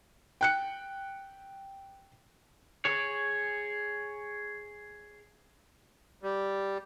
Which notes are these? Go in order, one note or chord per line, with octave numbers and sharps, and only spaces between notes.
G5 F#6 C#7
G#4 C#5
G3